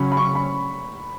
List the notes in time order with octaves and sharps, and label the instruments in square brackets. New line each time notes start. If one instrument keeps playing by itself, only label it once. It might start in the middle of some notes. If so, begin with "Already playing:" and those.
Already playing: [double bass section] C#3 F#3 C#4 [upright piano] B5
[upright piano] B5
C#6
B5